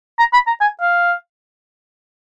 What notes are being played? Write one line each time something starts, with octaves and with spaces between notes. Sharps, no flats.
A#5
B5
A#5
G#5
F5